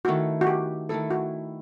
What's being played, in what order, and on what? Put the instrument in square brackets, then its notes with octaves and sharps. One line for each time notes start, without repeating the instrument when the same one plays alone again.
[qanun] D#3 A3 E4 [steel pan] F#4
[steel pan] F#4
G4
[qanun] D#3 A3 E4 [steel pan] A4
[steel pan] F#4